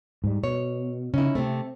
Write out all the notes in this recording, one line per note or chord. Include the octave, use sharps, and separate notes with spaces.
G#2 G3
B2 C#5
C#3 C#4 D#4 E4
C3 A3 C4